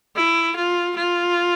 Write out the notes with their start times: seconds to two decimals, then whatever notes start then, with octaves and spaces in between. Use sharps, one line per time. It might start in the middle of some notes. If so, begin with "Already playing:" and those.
0.16 E4
0.56 F4
0.96 F4